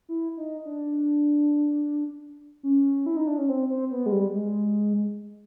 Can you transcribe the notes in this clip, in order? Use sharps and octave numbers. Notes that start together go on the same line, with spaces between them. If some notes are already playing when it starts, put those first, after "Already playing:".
E4
D#4
D4
C#4
E4
D#4
D4
C#4
C4
C4
B3
G#3
G3
G#3